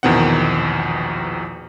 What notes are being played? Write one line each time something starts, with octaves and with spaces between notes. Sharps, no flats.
A#1 E2 B2 D#3 C4 F#5